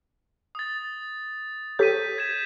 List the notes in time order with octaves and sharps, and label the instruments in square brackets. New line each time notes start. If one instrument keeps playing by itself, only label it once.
[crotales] D#6 A6
[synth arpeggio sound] G4 A4 C#5 [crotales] G6 B6 D#7
[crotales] G#6 B6 E7